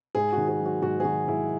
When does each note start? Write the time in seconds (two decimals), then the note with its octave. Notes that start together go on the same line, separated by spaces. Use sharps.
0.15 G#2 G#4
0.32 F#4
0.37 D#3
0.48 G#4
0.61 F#3 F#4
0.82 G#2 F#4
1.00 G#4
1.04 D#3 F#4
1.28 G#2 E4